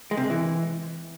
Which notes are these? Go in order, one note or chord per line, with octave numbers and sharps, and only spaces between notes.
G#3
C3
G#3
E3